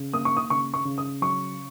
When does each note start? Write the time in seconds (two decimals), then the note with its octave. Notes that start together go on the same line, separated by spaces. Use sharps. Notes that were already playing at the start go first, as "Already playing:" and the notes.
Already playing: C#3
0.13 A#3 D#6
0.25 C#6
0.37 D#6
0.50 C#3 C#6
0.74 C#6
0.85 C#3
0.98 D#6
1.22 F#3 C#6